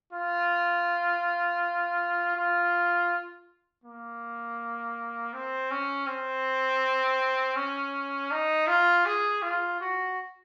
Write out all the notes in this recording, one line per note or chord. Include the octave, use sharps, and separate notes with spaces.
F4
F4
A#3
C4
C#4
C4
C#4
D#4
F4
G#4
F4
F#4